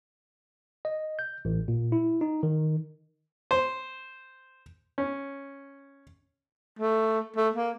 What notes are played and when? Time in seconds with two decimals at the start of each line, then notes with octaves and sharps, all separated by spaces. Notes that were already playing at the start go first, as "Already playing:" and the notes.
0.85 D#5
1.19 G6
1.45 A1
1.68 A#2
1.92 E4
2.21 D#4
2.43 D#3
3.51 C5
4.98 C#4
6.79 A3
7.36 A3
7.55 A#3